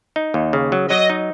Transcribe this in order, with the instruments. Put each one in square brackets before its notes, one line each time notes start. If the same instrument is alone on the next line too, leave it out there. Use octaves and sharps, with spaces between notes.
[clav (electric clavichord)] D#4
D#2
C#3
F#3
[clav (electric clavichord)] F#3 [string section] D#5
[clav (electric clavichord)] D#4